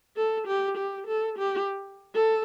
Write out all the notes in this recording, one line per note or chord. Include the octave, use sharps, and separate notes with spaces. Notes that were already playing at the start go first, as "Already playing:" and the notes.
A4
G4
G4
A4
G4
A4